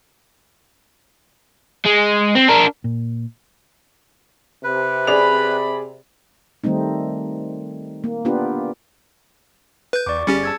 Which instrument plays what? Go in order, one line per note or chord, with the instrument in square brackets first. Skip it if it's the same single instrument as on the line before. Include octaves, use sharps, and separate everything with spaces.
[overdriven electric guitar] G#3
C4
D4 A#4
[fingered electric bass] A#2
[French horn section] C3 [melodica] B4
[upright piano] G#4 D5 F7 [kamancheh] B5
[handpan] D#3 G3 A3 C4 D#4
A#3
B3 D4 F4 G4 B4
[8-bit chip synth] B4 G6
[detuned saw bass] E2 [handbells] D5 C#6 D6
[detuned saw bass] G1 [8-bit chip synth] G3 C#4 G4 [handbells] G#4 A6 C#7
[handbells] A5 E6 G#6